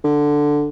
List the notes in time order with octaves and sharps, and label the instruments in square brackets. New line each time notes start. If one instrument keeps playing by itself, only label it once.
[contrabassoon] D3